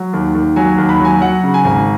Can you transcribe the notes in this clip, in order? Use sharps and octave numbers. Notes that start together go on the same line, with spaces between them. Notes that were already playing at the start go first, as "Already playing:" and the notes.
Already playing: F#3
D#2
D#2
F#3 G#5
D#2
B5
F#3
G#5
F#3 F#5
C#3
G#5
G#1